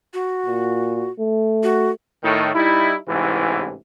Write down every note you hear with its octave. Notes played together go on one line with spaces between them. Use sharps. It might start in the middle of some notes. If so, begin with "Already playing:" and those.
F#4
A#2
A3
F#4
A2 D#3
G3 D#4 E4
A1 G#2 C3 E3